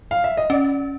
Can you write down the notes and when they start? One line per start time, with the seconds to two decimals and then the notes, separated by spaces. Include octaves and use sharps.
0.11 F5
0.24 E5
0.37 D#5
0.50 C#4 D5